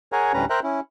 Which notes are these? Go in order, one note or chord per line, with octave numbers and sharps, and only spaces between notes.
G#4 A#4 C#5 F#5 G#5 A#5
D2 A2 G3 C#4 B4 A#5
A#4 C5 E5 G5 A#5 F#6
C#4 E4